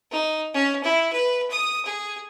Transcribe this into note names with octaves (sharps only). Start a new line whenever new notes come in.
D#4
C#4
E4
B4
D#6
G#4